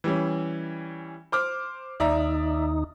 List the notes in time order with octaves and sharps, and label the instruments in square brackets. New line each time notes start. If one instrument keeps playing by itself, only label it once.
[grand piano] E3 G3 C#4
C5 D6 F6
[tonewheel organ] D#2 D#4 [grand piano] D5 E5 A#5